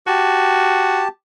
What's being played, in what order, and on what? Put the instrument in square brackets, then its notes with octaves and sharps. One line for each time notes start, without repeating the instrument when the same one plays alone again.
[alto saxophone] F#4 [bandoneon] G4 A5